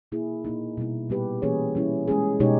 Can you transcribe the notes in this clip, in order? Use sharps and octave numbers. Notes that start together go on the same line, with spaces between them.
B2 A#3 E4 G#4
A#2 A#3 D#4
B2 G3 B3 E4
A#2 G3 B3 G4 B4
E3 A#3 C#4 G#4 C#5
G3 C#4 E4
G#3 C#4 G#4
B2 G#3 D#4 G4 C#5